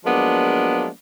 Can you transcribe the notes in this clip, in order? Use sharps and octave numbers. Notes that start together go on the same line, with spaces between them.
F3 F#3 G#3 A#3 B3 D4